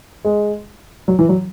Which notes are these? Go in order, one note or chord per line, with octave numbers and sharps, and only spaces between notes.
G#3
F#3
E3
F#3